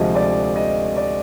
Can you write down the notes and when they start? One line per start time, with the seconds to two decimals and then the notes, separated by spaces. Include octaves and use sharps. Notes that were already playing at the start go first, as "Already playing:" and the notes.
Already playing: D2 C3 F3 G#3 D#5
0.15 D5
0.56 D#5
0.97 D5